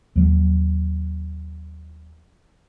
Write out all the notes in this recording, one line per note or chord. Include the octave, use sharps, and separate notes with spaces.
D#2 F#3